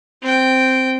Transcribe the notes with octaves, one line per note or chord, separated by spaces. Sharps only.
C4 G5